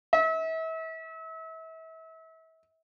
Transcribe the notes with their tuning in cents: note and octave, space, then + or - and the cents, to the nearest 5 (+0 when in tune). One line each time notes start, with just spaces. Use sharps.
E5 -35